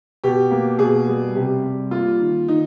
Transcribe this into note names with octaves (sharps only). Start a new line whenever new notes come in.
B2 G4
A#3
B2 G#4
G3
C3 G4
G3
A#3 F4
D#3
D#3 D#4